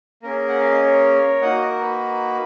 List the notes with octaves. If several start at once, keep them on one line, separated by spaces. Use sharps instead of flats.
A#3 C#4 G#4 A#4
F#5
F5
D#5
A#4 C#5
A#3 D#4 F#4 D#5 F#5
A#4
B4